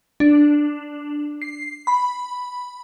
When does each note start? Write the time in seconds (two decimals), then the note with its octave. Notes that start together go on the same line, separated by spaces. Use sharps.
0.20 D4
1.42 C7
1.87 B5